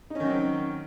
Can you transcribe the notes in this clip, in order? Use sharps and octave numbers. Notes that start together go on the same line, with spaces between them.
D#3 F#3 C4 C#4 D#4